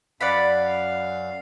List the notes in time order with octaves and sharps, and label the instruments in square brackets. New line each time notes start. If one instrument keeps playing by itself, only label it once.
[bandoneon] F#2 F5 [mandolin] D5 F#5 B5